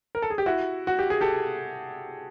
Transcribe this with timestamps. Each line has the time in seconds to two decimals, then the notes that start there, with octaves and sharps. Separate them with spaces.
0.15 A#4
0.22 A4
0.30 G#4
0.38 G4
0.46 E4 F#4
0.87 F#4
0.99 G4
1.10 G#4
1.21 G4 A4